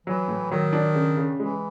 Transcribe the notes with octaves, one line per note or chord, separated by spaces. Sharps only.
E3 F#3
A2
D#3 F#3
D4
C#3
C#3
E3 G#3